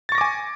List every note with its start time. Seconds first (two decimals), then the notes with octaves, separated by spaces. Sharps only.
0.09 A6
0.12 C#6
0.15 A#6
0.18 D6
0.21 G#5